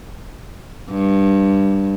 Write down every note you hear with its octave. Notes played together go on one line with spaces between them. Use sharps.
G2